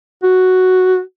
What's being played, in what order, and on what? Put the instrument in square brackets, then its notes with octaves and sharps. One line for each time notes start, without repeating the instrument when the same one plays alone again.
[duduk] F#4